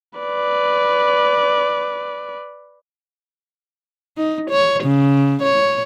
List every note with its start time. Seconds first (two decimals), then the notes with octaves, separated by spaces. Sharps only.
0.19 B4 D5
4.17 D#4
4.50 C#5
4.84 C#3
5.43 C#5